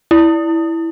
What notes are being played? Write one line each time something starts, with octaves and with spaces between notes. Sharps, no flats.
E4